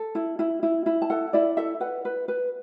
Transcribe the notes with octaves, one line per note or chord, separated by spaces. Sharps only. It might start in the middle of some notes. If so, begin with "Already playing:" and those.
Already playing: A4
E4
E4
E4
E4
A5
A4 F#5
E4 D5
A4 E5
B4 F#5
B4
B4